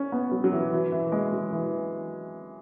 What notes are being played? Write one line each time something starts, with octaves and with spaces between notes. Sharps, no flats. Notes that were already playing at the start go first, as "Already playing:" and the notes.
Already playing: C#4
B3
F#3
F#3
E3
E3
E3
G#3
F#3
E3